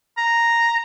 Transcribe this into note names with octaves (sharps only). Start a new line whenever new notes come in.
A#5